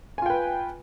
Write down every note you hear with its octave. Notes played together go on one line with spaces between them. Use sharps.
F4 B4 G5 G#5